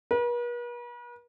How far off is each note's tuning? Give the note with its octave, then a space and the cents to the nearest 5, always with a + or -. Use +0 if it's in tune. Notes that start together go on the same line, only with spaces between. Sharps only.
B4 -45